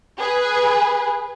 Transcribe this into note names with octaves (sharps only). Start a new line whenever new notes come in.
G#4 B4